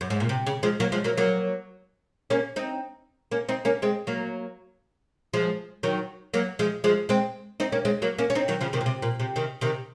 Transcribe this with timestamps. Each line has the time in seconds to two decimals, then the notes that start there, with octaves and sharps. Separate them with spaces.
0.01 F#2
0.10 G#2
0.20 A#2
0.29 C3
0.47 C#3
0.63 F3 G#3
0.80 F#3 A#3
0.92 F3 G#3
1.04 F#3 A#3
1.18 F#3 A#3
2.30 A#3 C#4
2.56 C4 D#4
3.32 A#3 C#4
3.49 C4 D#4
3.65 A#3 C#4
3.82 G#3 C4
4.07 F#3 A#3
5.33 F3 G#3
5.83 D#3 F#3
6.34 F#3 A#3
6.59 F3 G#3
6.84 F3 G#3
7.09 G#3 C4
7.60 C4 D#4
7.72 A#3 C#4
7.85 G#3 C4
8.02 F#3 A#3
8.19 A#3 C#4
8.30 C#4
8.35 C4 D#4
8.48 D#3 F#3
8.61 C#3 F3
8.73 C3 D#3
8.81 A#2
8.86 C3
9.02 A#2
9.20 C3
9.36 C3 D#3
9.61 C3 D#3